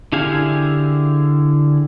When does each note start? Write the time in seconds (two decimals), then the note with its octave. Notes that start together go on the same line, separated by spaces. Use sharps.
0.12 D3 E4 G4 G#4 F5